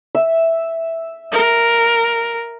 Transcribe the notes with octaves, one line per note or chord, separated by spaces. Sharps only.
E5
A#4